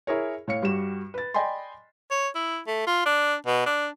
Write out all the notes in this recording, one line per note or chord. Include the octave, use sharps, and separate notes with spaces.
E4 G#4 A#4 C#5
A2 C#5 F5 C#7
G2 G3 F#4 E7
B4 A6
D5 D#5 G5 G#5 B5 C6
C#5
E4
A3
F4
D4
B2
D4